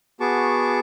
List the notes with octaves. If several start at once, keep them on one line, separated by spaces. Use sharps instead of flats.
B3 F#4 G#4 A5 C#6 D6